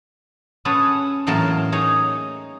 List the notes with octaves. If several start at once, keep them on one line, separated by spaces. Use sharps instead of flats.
C#4 G#4 A4 B4 F#5
E2 A2 F#3 A#3 A#4 A5
D#4 G#4 C#5 A#5